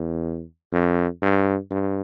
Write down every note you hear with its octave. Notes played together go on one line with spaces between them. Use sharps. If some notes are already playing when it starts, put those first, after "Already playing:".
Already playing: E2
F2
G2
G2